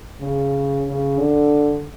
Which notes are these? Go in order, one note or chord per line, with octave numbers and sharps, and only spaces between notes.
C#3
C#3
D3